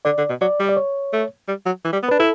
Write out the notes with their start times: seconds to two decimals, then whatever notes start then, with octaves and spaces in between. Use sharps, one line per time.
0.05 D3 D5
0.18 D3
0.29 B2
0.41 F#3 D5
0.59 G3
0.69 D5
0.77 C#5
1.13 A3
1.48 G3
1.66 F#3
1.85 E3
1.93 G3
2.03 B3
2.09 D4 B4
2.19 E4 A4